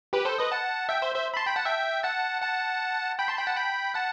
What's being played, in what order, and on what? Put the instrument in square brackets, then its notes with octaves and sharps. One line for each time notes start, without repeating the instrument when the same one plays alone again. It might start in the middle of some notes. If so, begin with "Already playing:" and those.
[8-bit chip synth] G4 B4
A4 C5
B4 D#5
F#5 A5
E5 G5
C5 E5
C5 E5
B5
A5 C6
G5 B5
F#5 A5
E5 G5
F#5 A5
F#5 A5
G5 B5
A5 C6
G5 B5
F#5 A5
G5 B5
F#5 A5